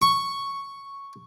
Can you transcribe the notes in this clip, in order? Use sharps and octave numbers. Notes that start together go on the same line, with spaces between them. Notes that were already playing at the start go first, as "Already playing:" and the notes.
C#6